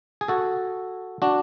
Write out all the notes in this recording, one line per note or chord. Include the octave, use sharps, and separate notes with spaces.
G#4
F#4 A4
D4 F#4